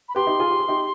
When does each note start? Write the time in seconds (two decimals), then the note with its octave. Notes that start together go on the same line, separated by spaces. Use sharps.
0.09 B5
0.15 G4 B4 C6
0.27 D#4 G4
0.39 F4 G#4
0.51 G4
0.59 G#4
0.68 D#4 G4